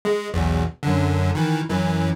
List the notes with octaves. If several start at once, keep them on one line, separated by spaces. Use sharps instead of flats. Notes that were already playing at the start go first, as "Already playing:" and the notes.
G#3
B1 E2
F#2 D3
D#3 E3
F#2 E3